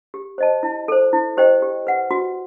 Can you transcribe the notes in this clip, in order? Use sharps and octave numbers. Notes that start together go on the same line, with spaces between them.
G4
C5 D#5 A5
E4
A4 C5
E4
G4 C5 D#5 G5
G4
B4 F#5
F#4